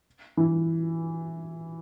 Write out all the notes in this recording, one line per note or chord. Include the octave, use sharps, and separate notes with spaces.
E3